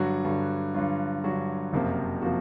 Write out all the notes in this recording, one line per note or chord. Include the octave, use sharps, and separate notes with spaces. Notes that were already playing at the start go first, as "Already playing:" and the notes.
Already playing: G2 D3 F#3 F#4
G2 D3 F#3
G2 D3 F#3 F4
G2 D3 F#3 F#4
F#1 F2 C3 F3 A#3
C3 F3 A#3 F#4